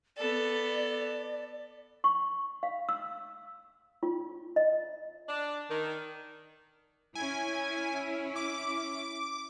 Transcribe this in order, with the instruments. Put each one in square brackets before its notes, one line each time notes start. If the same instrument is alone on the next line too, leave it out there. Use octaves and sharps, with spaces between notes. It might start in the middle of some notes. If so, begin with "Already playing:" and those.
[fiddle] B3 A4 [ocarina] D5
[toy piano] C#6
F5
E6
F4
D#5
[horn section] D4
D#3
[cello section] C#4 E4 [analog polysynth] G#5
[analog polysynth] D6